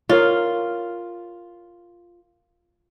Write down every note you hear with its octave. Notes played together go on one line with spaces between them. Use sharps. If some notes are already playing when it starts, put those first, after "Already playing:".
F4 A#4 C#5 F5